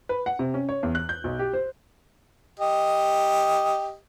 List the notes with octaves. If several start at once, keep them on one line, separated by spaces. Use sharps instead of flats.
B4
F#5
C3
C#4
C#5
E2
F#6
G6
B1
G4
C5
G4 D#5